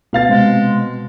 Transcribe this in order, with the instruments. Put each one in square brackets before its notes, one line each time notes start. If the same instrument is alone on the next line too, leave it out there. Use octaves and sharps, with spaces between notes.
[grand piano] B2 F5 A6 [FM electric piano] A3
[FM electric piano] C3 C4 [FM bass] G#3